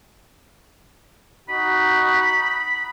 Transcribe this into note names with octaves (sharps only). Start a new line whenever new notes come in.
D#4 F#4 B5